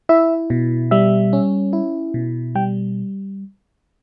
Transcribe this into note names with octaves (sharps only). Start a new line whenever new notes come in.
E4 E5
B2
G3 E5
C#4
E4
B2
G3 G5